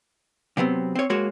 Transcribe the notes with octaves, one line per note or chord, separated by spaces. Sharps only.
C3 F#3 B3 C4
C4 C#5
G#3 A#3 F#4 C#5